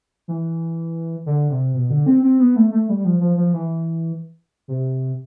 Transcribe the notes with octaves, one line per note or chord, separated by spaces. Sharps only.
E3
D3
C3
B2
D3
C4
C4
B3
A3
A3
G3
F3
F3
F3
E3
C3